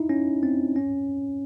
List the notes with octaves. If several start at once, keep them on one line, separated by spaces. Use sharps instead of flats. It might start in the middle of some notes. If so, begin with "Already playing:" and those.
Already playing: D#4 E4
C#4
C4
C#4